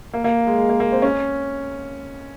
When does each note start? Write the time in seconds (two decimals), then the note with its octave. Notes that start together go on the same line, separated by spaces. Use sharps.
0.14 A#3
0.24 A#3
0.47 G#3
0.58 G#3
0.69 A#3
0.80 A#3
0.92 C4
1.02 C#4